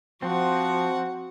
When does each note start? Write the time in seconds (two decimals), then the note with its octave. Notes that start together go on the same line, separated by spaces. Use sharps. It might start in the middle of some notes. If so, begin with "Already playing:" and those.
0.22 F3 C4 F#4 F#5